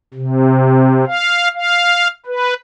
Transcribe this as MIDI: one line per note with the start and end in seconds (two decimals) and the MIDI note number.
0.14 1.05 48
1.07 1.48 77
1.54 2.08 77
2.26 2.54 71